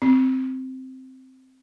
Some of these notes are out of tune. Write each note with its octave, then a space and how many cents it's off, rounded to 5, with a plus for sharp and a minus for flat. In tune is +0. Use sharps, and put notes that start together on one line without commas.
C4 -5